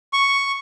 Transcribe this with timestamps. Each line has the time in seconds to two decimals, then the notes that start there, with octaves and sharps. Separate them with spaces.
0.13 C#6